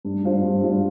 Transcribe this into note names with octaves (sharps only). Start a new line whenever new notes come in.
G2
G3 F4 C5
G2
G3 F4 C5